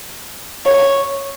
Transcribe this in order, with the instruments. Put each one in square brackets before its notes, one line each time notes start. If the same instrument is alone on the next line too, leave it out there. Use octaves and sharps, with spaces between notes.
[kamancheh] C#5